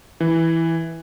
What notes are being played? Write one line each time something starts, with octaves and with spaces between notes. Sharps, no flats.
E3